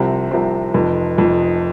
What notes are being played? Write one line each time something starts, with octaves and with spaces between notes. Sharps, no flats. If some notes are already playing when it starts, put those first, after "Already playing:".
Already playing: C2 C3 F3 C4
C2 C3 F3 C4
F1 F2 F3
F1 F2 F3